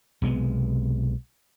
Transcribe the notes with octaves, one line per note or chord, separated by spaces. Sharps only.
B1 C3 G#3 B3